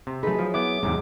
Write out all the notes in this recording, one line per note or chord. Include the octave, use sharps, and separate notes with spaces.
C3
F#3 A3 D#4 G#4 B4
F3
B3 E4 D6
E2 G#2 C3 G#3